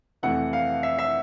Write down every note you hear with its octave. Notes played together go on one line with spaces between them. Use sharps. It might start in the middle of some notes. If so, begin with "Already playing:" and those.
F2 C3 E3 A3 F#5
F5
E5
E5